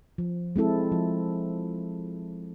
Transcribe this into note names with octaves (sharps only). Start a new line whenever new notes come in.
F3
G#3 C4 E4 A4
F3